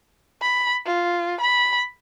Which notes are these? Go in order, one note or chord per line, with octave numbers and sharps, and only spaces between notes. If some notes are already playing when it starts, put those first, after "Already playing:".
B5
F4
B5